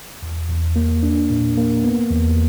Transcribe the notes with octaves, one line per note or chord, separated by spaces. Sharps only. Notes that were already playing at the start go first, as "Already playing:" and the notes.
E2
E2
A#3
D4
A#2
A#3
B3
E2